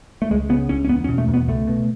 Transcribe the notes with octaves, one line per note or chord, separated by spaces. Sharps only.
A3
C#2 G#3
C#3 B3
C#2 C#4
C#4
E2 B3
C#4
B2
A3
E2
B3
C#2 A3
B2